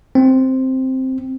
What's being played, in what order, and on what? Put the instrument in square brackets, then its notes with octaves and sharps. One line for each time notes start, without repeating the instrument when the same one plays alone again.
[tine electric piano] C4